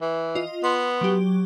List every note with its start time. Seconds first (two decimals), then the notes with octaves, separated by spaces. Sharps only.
0.01 E3
0.35 F4 D#5
0.64 B3 C6
1.01 F#3 G4